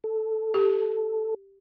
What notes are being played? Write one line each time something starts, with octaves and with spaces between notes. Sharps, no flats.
A4
G4